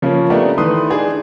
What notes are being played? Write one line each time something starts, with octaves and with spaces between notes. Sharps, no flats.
C#3 F3 A#3 C#4
A3 B3 D4 G4 A#4 D#5
D#3 E3 A3 B4 C6 D#6
D4 D#4 G#4